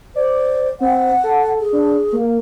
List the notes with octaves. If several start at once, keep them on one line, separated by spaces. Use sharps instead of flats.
C5 D5
C4 F#5
A4
G#4
D4
A#3